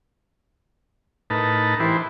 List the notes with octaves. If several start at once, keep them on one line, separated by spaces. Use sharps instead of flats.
A2 D#4 A#4 B4 A5
E3 E4 G4 B4 C5